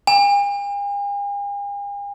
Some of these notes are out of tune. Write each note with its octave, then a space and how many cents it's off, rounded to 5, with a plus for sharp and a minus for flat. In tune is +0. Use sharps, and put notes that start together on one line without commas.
G#5 -45